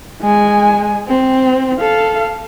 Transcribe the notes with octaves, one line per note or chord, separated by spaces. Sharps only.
G#3 G#5
C4
A4 F5